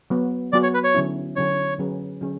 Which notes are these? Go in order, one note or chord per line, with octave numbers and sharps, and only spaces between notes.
F#3 B3 F#4
F#3 B3 F#4 D5
C#5
B4
C#5
D3 F#3 C#4 E4
D3 F#3 C#4 E4 C#5
D3 F#3 C#4 G#4 B4
D3 F#3 C#4 G#4